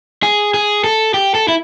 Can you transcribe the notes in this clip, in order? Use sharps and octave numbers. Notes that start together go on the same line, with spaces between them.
G#4
G#4
A4
G4
A4
E4